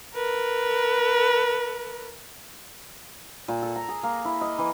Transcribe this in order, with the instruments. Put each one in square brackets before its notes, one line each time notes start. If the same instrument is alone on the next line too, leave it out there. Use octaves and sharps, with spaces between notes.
[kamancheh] A#4 B4
[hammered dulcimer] A#2
A4
A#5
G#4
A#3
E4
D#5
E3